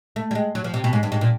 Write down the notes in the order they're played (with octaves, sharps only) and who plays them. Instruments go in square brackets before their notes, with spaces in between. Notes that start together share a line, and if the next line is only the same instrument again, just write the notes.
[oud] A3
G3
G#3
F#3
F3
C3
B2
G#2
G2
G#2
A#2